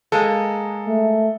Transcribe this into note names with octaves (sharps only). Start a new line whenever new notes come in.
G#3 A#3 A4
A3